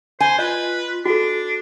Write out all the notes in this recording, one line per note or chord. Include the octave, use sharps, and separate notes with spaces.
C5 G#5
F4 B4 D#5
D4 F#4 A4